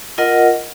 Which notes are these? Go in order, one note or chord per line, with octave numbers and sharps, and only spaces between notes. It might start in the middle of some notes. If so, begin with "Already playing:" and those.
F4 A#4 D#5 F#5